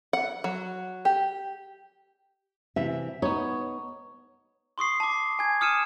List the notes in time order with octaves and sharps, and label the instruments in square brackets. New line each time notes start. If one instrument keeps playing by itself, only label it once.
[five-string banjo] F#5
F#3
G4
[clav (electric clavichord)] C3 E3 [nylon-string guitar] E5
[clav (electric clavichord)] B3 D#4 [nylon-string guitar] C#5
[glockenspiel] C6 C#6 D#6 C7
A5 D6
G#5 G#6
D#6 F6 C#7 D#7 E7